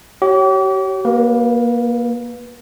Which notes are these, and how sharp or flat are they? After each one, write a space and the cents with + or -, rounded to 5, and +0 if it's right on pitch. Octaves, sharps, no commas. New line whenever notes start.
G4 -40 C#5 -5
A#3 +20 B4 -15